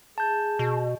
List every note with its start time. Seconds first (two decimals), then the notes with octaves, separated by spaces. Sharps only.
0.18 G#4 A5 G6
0.59 B2